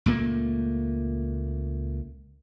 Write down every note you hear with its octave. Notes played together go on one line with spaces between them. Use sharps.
C#2 A#2 A3 A#3